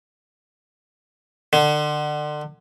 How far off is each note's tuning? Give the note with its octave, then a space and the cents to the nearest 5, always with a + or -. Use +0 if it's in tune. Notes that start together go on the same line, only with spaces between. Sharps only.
D3 +30